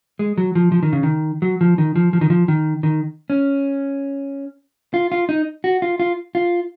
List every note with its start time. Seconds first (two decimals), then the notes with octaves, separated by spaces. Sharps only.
0.19 G#3
0.38 F#3
0.55 F3
0.72 F3
0.83 D#3
0.93 C#3
1.03 D#3
1.42 F#3
1.61 F3
1.78 D#3
1.96 F3
2.13 F3
2.21 D#3
2.30 F3
2.48 D#3
2.83 D#3
3.30 C#4
4.94 F4
5.12 F4
5.29 D#4
5.64 F#4
5.82 F4
6.00 F4
6.35 F4